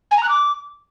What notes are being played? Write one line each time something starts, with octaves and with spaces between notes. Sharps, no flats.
G#5
A#5
F#6
D6